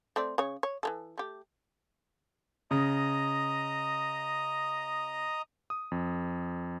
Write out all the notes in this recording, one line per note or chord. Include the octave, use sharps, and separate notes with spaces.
A3 C4 D5
C#3 C#5
C#5
E3 G#3 A4
A3 G4
C#3 D#5 A#5 D#6
D#6
F2